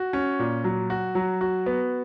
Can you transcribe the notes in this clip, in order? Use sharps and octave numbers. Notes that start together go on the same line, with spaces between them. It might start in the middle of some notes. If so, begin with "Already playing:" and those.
Already playing: F#4
C#4
A#2
F#3
F#4
F#3
F#4
B3